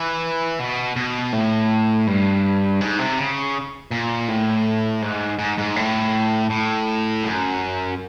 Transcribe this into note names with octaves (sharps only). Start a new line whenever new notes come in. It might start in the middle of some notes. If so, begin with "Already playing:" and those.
Already playing: E3
B2
B2
A2
G2
G#2
C3
C#3
A#2
A2
G#2
G#2
G#2
A2
A2
F#2